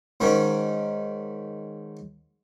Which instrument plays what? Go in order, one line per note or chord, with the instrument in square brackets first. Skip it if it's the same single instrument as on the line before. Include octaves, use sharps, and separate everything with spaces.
[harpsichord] G#2 D#3 C#4